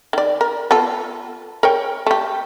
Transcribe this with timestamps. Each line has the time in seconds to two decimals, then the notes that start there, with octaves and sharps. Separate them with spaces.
0.13 D#3 D5
0.41 A#4
0.71 B3 F4 A4
1.63 A#4 C#5 G5
2.07 A3 G4